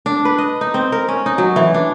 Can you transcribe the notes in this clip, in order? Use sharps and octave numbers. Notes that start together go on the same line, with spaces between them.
D4
B4
D#5
D#4
C4
A#4
C#4
D#4
F#3
E3
D4